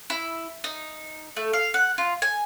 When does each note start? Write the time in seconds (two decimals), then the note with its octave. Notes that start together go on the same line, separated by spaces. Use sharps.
0.10 E4
0.64 D#4
1.36 A3
1.53 F5
1.74 F#5
1.98 F4
2.22 G#5